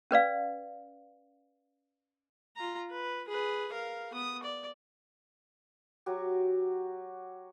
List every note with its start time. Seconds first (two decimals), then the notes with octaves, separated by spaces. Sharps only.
0.11 C#4 B4 D5 F5
2.56 F4 A#5
2.91 B4
3.28 G#4 B4
3.73 A#4 F5
4.13 B3 D#6
4.43 D5
6.06 F#3 F#4 G4